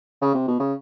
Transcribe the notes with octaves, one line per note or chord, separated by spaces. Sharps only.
C#3
C3
B2
C#3